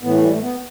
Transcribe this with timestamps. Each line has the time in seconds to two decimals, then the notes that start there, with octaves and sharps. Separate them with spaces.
0.03 A2 E3 B3
0.13 A3
0.22 G3
0.32 A3
0.42 B3